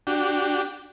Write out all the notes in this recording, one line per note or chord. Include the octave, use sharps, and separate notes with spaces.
D4 F#4 G4